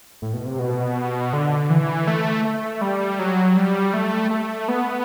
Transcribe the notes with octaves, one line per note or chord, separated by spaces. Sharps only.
A2
B2
C3
B2
D3
E3
A3
A3
G3
F#3
G3
A3
A3
B3